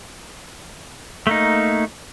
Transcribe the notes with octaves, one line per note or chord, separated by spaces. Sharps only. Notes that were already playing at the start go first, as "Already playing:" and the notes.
A3 A#3 D#4